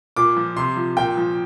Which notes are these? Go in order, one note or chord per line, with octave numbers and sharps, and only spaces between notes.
A#2 D6
F3
C3 C6
F3
A#2 G5
F3